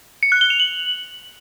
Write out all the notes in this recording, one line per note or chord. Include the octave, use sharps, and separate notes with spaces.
C#7
F#6
G7
F7
F#7